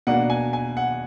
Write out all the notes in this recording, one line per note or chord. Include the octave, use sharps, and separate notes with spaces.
B2 A#3 D4 F#5
G#5
G#5
F#5